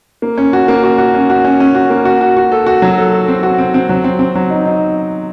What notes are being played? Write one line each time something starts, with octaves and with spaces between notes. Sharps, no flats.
A#3
C#4
F#4
A#3
F#4
F#4
C#4
F#4
C#4
C#4
F#4
A#3
F#4
F#4
F#4
A4
F#4
F#3
A4
A4
C4
F#4
C4
C4
F#3
C4
C4
F#3
D#4
D#4